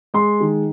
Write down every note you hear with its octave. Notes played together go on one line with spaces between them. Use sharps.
G#3 C6
D#3